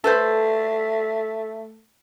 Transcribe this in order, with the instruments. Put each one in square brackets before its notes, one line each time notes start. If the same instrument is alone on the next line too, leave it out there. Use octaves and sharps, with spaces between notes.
[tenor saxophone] A3 [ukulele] A4 B4 C5